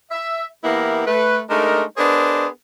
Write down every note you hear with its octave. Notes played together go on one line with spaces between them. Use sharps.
E5
E3 A#3 B3 E4 G4 A#4
A3 B4
G#3 A3 D4 D#4 A#4
B3 D4 G#4 A#4 C5 D#5